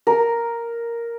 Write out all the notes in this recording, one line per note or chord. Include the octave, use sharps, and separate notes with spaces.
A#4